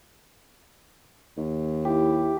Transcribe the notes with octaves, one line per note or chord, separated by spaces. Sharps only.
D#2
E4 G4